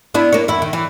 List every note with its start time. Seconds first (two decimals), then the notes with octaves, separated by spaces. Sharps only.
0.14 B3 D4 E4
0.33 A#3 C#5
0.48 E2 E4
0.62 D#3
0.73 E3